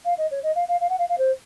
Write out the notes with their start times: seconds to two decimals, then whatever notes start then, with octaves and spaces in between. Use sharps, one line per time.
0.05 F5
0.18 D#5
0.31 C#5
0.43 D#5
0.56 F5
0.68 F5
0.81 F5
0.89 F#5
0.99 F5
1.09 F5
1.18 C5